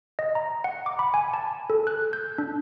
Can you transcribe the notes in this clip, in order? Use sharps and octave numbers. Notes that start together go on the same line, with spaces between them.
D#5
A#5
F#5
D6
B5
G#5
A5
A4
F#6
G6
D4